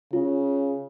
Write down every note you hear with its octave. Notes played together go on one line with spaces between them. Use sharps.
C#3 F4